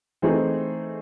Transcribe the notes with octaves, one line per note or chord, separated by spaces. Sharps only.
E3 A3 C4 D#4 G#4